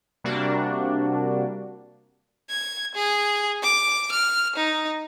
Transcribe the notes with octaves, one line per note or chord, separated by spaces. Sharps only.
C3 G3 A#3 D4 F#4
G#6
G#4
D6
F6
D#4